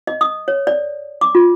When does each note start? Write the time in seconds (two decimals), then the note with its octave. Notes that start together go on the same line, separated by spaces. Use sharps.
0.07 D#5
0.21 D#6
0.48 C#5
0.67 D5
1.21 D6
1.35 F4